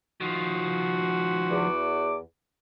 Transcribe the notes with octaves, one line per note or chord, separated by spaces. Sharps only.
D#3 F3 F#4
E2 D6